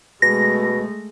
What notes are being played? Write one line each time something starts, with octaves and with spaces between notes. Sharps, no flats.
B2 G#3 A3 A#6